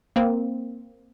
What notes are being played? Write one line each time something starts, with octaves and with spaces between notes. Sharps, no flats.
A#3 C4